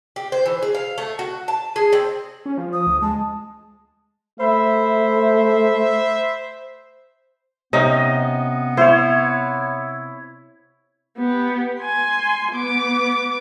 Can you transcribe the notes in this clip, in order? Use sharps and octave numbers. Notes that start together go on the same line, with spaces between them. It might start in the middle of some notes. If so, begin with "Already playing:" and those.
G4
C5
E3
G#4
F5
A3
F#4
A5
G#4
C4
C#4
F3
D#6
D2
G#3 A5
A3 C5 E5 B5
C3 B3 C#4 D#4 D#5
E4 C5 C#5
B3 G4
G#5 C6
B3 D6